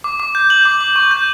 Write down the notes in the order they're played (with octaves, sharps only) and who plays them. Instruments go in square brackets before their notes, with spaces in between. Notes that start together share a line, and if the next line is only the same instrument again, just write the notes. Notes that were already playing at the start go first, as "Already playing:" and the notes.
[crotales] D6
D6
G6
G6 F#7
D6
D6
C#6
G6